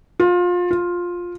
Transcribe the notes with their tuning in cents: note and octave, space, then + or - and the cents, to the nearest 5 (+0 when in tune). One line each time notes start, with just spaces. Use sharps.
F4 +25
F4 +10